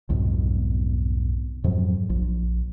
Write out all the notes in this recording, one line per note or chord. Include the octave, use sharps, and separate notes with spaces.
B1 F2 G#2 B2
F2 G#2 F#3
A#1